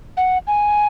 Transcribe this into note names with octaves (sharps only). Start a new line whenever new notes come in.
F#5
G#5